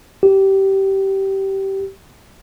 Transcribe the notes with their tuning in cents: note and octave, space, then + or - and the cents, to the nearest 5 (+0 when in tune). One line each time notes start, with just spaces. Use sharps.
G4 -20